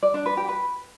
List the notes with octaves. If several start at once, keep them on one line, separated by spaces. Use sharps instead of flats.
D5
D4
B4
G4
B4